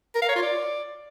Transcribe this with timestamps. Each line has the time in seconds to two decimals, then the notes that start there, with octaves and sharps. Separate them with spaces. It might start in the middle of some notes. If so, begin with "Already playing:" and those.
0.15 A#4
0.22 F5
0.29 C#5
0.36 F4
0.42 D5